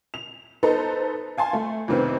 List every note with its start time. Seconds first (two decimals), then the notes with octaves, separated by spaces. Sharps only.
0.14 F7
0.63 B3 D#4 A4 B4 C5 A#5
1.37 F5 G#5 A5 C6
1.53 A3
1.88 F2 A2 C3 D#3 B3 C4